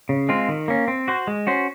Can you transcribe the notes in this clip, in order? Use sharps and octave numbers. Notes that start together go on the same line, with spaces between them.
C#3
G#3 C4 F4
D#3
A#3 C#4
C4
F#4 C5
G#3
C#4 F#4 C5